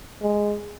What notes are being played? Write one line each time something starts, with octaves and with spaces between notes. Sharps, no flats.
G#3